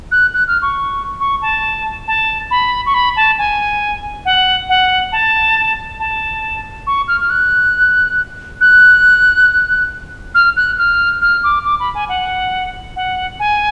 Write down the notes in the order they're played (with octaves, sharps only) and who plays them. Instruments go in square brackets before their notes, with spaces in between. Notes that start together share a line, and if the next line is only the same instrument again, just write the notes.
[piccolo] F#6
F#6
F6
C#6
C#6
A5
A5
B5
C#6
B5
A5
G#5
F#5
F#5
A5
A5
C#6
F6
F6
F#6
F#6
F6
F#6
F6
F6
D6
D6
B5
G#5
F#5
F#5
G#5